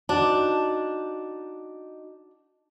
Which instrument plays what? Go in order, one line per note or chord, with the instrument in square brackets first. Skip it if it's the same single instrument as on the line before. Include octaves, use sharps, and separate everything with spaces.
[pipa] D4 [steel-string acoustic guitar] D#4 F#4